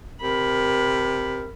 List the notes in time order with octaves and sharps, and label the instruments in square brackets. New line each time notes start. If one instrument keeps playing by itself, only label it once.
[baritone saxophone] C3 [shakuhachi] A#4 [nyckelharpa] B5